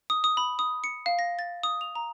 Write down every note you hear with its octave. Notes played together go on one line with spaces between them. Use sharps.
D#6
D#6
B5
D#6
C#7
F5
A#6
A6
D#6
F7
A#5